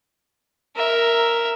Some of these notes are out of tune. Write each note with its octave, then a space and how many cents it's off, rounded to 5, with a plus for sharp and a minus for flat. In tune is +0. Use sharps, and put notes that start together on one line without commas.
A#4 +0 E5 +0